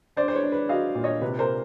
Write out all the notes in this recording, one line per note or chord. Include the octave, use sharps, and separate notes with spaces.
D4 C5 D5
C5
B4 C#5
D4
B4
F#3 D#5 F5
A#2
C#5 D#5
C3 B4
A#4 C5